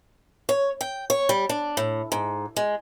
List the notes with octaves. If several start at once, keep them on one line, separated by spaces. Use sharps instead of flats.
C#5
G5
C#5
G3
D4
A2
G#2
G#3